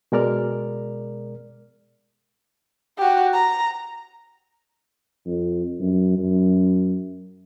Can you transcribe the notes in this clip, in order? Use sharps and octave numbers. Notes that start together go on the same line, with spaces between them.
B2 G#3 A#4 D5 F6
F#4 G4
A#5
F2
F#2
F#2